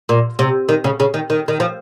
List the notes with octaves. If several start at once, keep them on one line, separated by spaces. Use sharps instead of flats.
A#2
C3
D#3
C#3
C#3
D#3
D#3
D#3
F3